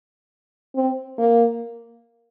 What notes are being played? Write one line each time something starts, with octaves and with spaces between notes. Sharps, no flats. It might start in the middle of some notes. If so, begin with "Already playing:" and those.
C4
A#3